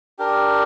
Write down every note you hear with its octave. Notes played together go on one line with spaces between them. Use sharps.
D4 G4 A#4